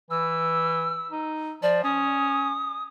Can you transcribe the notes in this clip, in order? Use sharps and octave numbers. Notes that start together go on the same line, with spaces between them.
E3 E6
D#4
F3 D5
C#4 D#6